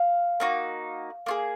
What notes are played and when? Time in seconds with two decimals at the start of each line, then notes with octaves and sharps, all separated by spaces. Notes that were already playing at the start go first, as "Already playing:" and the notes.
Already playing: F5
0.40 A#3 D#4 F#4
1.26 A#3 F4 G#4